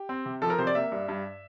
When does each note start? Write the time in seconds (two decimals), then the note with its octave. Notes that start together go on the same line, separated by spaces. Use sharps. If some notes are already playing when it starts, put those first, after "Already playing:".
Already playing: G4
0.09 C4
0.26 C3
0.42 F3 A4
0.50 A#4
0.58 C3 C5
0.67 D5
0.75 A#3 E5
0.92 G2
1.08 G2